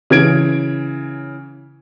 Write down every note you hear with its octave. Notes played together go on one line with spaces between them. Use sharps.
C#3 E3 G#6 D7